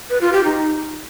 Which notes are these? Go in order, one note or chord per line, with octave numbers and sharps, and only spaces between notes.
B4
F4
G4
D#4